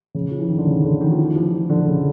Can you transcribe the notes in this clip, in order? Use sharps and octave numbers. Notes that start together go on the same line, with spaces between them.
C#3
F3
E3
D#3
D3
C#3
D3
D#3
F3
E3
F3
E3
D3
C#3